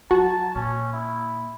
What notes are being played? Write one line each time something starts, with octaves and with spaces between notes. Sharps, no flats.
F#3 F#4 A5
A#2 C#4
E4